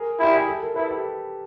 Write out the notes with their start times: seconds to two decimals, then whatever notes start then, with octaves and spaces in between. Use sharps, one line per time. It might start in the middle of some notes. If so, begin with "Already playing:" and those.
Already playing: G#4 A#4
0.19 E4 G4
0.36 G#4
0.49 A4
0.62 A#4
0.75 E4 A4 B4
0.90 G4 A4